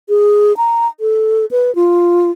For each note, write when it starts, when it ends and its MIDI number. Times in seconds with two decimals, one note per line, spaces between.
0.09 0.56 68
0.57 0.87 82
1.00 1.45 69
1.51 1.74 71
1.75 2.31 65